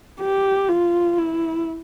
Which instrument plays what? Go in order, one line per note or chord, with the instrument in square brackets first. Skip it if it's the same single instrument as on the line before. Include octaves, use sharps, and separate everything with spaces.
[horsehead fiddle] G4
F4
E4